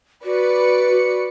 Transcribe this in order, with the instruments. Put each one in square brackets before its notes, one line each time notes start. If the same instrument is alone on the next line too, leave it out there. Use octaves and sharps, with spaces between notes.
[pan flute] F#4 [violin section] B4 D5 C#7